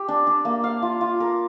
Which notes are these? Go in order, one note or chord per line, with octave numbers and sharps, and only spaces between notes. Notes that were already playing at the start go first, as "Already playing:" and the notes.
Already playing: G4
D4
D4
A#3
F5
F4
F4
A#4